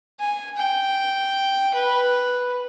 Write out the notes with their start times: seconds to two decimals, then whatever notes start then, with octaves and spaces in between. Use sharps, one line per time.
0.20 G#5
0.58 G5
1.74 B4